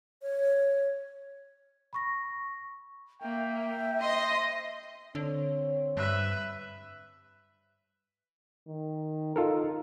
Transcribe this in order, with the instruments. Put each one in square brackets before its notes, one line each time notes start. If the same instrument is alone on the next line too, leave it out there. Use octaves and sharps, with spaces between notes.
[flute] C#5
[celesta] B5 C#6 A#6
[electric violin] A#3 [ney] E5 [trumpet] G5
[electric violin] C5 C6 [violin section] D#5
[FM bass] D3 [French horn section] C4 C#5
[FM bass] G2 [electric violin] B4 E5
[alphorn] D#3
[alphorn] D#4 [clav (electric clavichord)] F4 A4 A#4